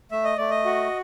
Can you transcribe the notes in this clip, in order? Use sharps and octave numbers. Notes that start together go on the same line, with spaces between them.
A3 E5
D#5
A3 D5
D#5
F#4